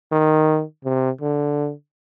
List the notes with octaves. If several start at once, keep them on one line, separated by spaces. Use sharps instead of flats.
D#3
C3
D3